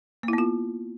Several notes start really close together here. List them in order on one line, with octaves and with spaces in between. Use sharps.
A#3 E4 B3 F4